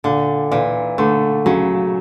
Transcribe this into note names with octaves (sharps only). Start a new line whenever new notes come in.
A#2 D3
A#2 E3
D3 A3
C#3 F#3